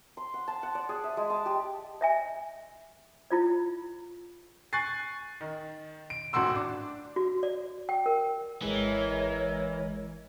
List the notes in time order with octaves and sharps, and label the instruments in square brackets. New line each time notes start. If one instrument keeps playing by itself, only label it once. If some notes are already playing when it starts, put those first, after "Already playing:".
[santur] C6
F#5
A5
F#5
D5
G#4
E5
G#3
A5
G4
[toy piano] D#5 E5 G#5
E4 F4 D5
[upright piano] G#5 C#6 F#6 A6 C7
D#3
D7
D#1 G#1 A2 F#4 C6 E6
D4 D6
[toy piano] F#4
D5
G5
A#4
[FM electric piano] G#1 G#3 G#5 [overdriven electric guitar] E3 [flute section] A#4 C#5 D#5